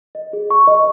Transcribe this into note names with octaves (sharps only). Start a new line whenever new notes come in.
D#5
G#4
C#6
D#5